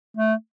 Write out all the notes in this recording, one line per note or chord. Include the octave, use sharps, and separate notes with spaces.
A3